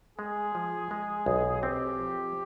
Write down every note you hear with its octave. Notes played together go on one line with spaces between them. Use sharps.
G#3 G#4
F3
G#3
B1
C4 G4
F3